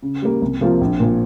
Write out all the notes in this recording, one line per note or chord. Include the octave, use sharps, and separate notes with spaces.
C#3
G3 A#3
C2
C3 F3 A#3 F4
A#1
A#2 F3